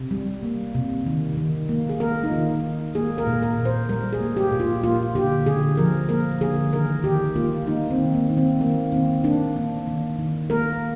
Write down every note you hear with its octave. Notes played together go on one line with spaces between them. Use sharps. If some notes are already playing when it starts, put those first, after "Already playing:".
Already playing: C3
G3
A#3
C3
D#3
D#3
A#3
G#4
A#3 A#4
D#4
D#3 F4
D#3
A#3 G#4
A#4
A#2
A#4
A#2
C5
G3 A#4
G#4
A#3
G4
A#2
F4
A#3 F4
D3 G4
D3 G#4
F3 A#4
A#3 A#4
D3 G#4
D#3 A#4
D#3 G4
A#3 F4
A#3 D#4
C4
D#3
A#3
D#3
C4
D#3 A#3
D#3 C4
A#3 D4
A#3
D#3
D#3
A#3 A#4